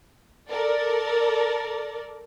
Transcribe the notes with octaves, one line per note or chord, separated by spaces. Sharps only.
A4 A#4 D5